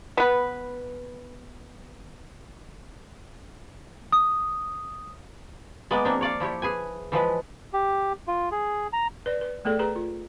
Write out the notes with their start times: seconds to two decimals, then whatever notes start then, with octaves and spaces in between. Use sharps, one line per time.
0.17 B3 B4
4.12 D#6
5.91 G#3 A#3 B3 D5
6.05 F3 A#3 C4 D4
6.21 C#5 D5 F5
6.40 F3 E4 G4 C#5
6.62 G#4 B4 G#5
7.12 E3 F3 G#3 B4
7.73 G4
8.28 F4
8.51 G#4
8.93 A#5
9.26 B4 D5
9.41 B4
9.65 A3 B3 G#4 A4 D5
9.79 G#4 B4 A#5
9.96 F4